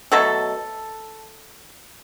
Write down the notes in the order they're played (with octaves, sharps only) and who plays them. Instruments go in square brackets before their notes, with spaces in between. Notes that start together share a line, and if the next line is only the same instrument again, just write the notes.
[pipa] B2 F#3 A3 A4